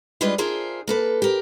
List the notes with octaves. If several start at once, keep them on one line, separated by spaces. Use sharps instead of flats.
G3 G#3 D4 F4 B4 D#5
D4 F4 G#4 A#4 C5 E5
A#3 A4 B4
G4 A#4